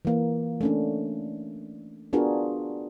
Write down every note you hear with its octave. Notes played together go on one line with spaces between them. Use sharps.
E3 A#3
A3 C#4 D4
B3 D4 F4 F#4 G#4 A#4